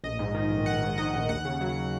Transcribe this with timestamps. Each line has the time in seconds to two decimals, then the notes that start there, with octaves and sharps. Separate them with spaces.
0.04 A#1 D#5
0.19 G#2
0.35 D#3
0.50 A#1
0.66 A#1 F#5
0.82 G#2
0.98 D#3 D#5
1.14 A#1
1.29 D#2 F#5
1.45 C#3
1.61 F#3